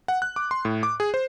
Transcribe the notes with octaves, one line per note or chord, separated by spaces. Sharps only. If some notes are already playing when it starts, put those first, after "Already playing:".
F#5
F#6
D6
C6
A2
D6
G#4
C5